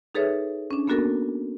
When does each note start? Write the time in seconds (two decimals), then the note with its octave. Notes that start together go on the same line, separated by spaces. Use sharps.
0.15 D#4 G#4 A4 B4 C#5 E5
0.71 C#4 D4
0.87 A#3 B3 D4 F#4 A4 A#4